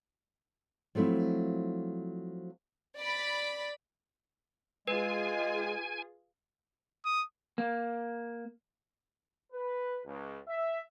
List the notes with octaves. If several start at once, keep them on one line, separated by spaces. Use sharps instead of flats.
F3 F#3 A3 C4 E4
D5 B5
G#3 F4 G#4 B4 G#5
D#6
A#3
B4
C#2
E5